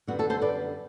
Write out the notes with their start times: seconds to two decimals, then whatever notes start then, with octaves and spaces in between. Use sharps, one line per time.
0.07 F#2 D3 G3 B3 F#4
0.19 F#4 A4
0.30 A4 C5
0.42 B4 D5